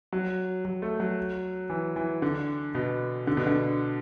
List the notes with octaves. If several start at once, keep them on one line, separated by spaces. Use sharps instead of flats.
F#3
F#3
A3
F#3
E3
E3
D3
B2
D3
B2
D3